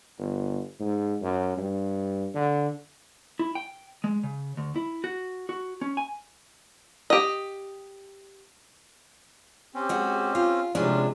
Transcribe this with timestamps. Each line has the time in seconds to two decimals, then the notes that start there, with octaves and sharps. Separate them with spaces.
0.18 G1
0.80 G#2
1.22 F#2
1.58 G2
2.35 D3
3.39 E4
3.55 G5
4.04 G#3
4.23 C#3
4.57 D2
4.76 E4
5.04 F#4
5.49 F#4
5.81 C#4
5.97 G#5
7.10 G4 D#5
9.74 C4 C#4 G4
9.89 G#3 F#4
10.35 F4
10.75 A2 C3 F3 G#3 C#4 D4